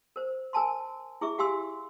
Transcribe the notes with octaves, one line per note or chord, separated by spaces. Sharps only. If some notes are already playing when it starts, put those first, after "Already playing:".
A#4 C5
A#4 G#5 A5 C6
E4 G#4 E5 C#6
G4 F5 G#5 C6 E6